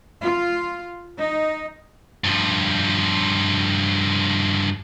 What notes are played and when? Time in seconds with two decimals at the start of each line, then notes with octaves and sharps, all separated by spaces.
0.21 F4
1.18 D#4
2.24 G2 F3